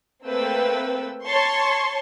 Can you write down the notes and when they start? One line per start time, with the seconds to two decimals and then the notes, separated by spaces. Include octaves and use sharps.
0.24 A3 A#3 C4 B4 G5 E6
1.25 C#5 A5 C6 C#6